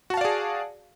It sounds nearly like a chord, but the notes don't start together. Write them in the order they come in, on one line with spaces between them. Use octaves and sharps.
F#4 A5 F5 D5 G#4